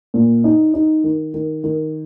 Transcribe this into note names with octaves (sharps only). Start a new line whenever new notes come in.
A#2
D#4
D#4
D#3
D#3
D#3